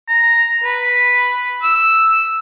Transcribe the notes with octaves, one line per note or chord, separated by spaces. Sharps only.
A#5
B4
E6